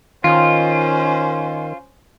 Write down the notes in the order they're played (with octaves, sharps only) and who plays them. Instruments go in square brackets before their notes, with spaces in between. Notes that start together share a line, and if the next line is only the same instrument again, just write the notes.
[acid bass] D#3 [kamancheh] C#4 C5 [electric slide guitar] F4